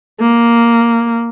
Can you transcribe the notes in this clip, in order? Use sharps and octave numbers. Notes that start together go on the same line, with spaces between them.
A#3